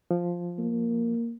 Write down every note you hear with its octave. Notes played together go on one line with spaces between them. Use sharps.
F3
A#3